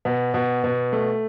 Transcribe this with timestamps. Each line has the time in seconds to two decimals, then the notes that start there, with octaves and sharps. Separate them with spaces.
0.05 B2
0.34 B2
0.64 B2
0.93 A3